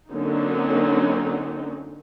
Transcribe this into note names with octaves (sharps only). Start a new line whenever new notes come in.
D3 F#3 A#3 C4 C#4 D#4